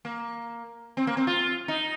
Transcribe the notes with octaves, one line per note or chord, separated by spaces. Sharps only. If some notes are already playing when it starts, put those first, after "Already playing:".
A#3
C4
A#3
C4
F4
D#4